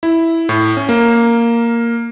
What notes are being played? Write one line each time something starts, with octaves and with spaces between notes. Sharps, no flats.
E4
A2
C#4
A#3